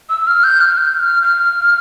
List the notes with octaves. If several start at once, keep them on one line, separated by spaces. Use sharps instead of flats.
E6
F6
G6
F6
G6
F6
F6